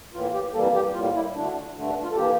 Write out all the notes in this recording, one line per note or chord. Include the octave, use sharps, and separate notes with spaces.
A2 E3 A#3 F4
G4
F2 E3 G3 A#3 A4
G4
A2 G3 A#3 F4
E4
D2 D3 A3 D4
G2 D3 A3
D4
F4
A4
E3 A#3 G4